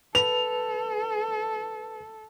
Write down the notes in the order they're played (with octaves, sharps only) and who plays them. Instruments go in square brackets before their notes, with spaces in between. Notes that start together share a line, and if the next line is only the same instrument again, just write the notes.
[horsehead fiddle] A4 [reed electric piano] B4 [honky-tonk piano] F7